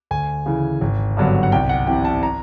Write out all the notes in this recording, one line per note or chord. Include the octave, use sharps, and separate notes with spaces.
D2 G#5
C#3 E3
G#1
G2 D3 F#3 B3
F#5
C2 G5
F#5
C3 E3 G5
A5
A#5